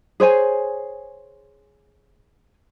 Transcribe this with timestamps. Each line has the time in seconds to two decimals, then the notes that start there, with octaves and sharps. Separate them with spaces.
0.20 G#4 C5 C#5 G#5